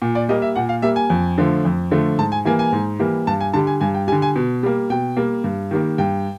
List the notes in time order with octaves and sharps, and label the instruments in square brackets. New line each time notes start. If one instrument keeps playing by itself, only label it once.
[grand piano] A#2
D5
G3 A#3 D#5
E5
A#2 F#5
F5
G3 A#3 E5
G#5
F2
D3 F3 A3
F2
D3 F3 A3
G#2 A5
G#5
E3 G3 A#3 G#5
G#5
G#2
E3 G3 A#3
G2 A5
G#5
D3 G3 A5
G#5
G2 G#5
G5
G3 G#5
D3
G#5
B2
G3 A#3
B2 G5
G3 A#3
G2
D#3 G3 A#3
G2 G5